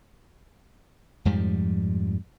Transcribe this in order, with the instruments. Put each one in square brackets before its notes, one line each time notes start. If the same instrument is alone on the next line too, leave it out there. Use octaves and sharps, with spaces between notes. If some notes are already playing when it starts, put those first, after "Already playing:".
[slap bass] F2 G#2 F3 G3